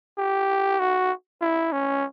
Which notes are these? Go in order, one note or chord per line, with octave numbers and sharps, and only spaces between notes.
G4
F#4
E4
C#4